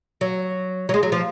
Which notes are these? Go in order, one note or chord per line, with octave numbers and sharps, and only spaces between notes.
F#3
F#3
G#3
F#3
F3